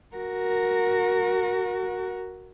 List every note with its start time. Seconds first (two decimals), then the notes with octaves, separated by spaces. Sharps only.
0.16 F#4 A#4